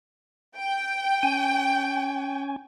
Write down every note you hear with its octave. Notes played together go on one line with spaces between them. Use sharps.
G5
C#4 G#5